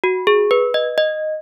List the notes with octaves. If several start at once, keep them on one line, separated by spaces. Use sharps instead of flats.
F#4
G#4
B4
D#5
D#5